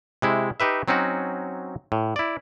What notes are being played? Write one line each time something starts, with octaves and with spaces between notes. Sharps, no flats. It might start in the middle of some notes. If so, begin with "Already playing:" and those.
C3 G#3 E4
D#4 G4 B4 E5
F#3 C4 C#4 D#4 F#4
A2
E4 D5